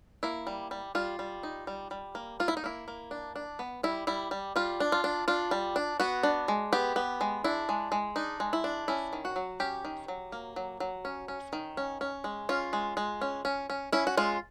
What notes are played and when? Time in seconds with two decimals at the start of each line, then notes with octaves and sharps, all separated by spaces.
0.23 A#3 E4
0.47 G3
0.71 G3
0.95 G3 F4
1.19 G3
1.43 D#4
1.67 G3
1.91 G3
2.15 A#3
2.40 A#3 F4
2.48 E4
2.57 D#4
2.64 A#3 E4
2.88 A#3
3.11 D4
3.36 D4
3.59 B3
3.83 G3 E4
4.07 G3 E4
4.31 G3
4.56 G3 F4
4.80 D4
4.92 F4
5.04 D4
5.28 D4 F4
5.51 G3
5.76 D4
6.00 B3 F#4
6.23 D4
6.48 G#3
6.73 B3 G4
6.96 B3
7.21 G#3
7.44 D4 E4
7.69 G#3
7.92 G#3
8.16 D4 D#4
8.40 G#3
8.53 E4
8.64 D4
8.88 C#4 E4
9.13 D#3
9.25 F#4
9.36 F#3
9.60 C#4 G4
9.85 D#3
10.08 F#3
10.32 A#3
10.56 F#3
10.80 F#3
11.05 C#4
11.28 C#4
11.53 D#3
11.77 C#4
12.01 C#4
12.24 G#3
12.49 C#4 F4
12.73 G#3
12.97 G#3
13.21 C#4
13.45 C#4
13.70 C#4
13.92 C#4 E4
14.07 F#4
14.17 G#3 F4